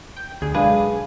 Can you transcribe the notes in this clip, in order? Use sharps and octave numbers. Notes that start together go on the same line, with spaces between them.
G5
D2 G#4
B1 D3 G#3 D4 G#4 B4 F5